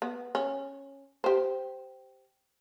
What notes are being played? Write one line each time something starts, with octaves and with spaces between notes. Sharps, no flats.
B3
C#4
G4 C5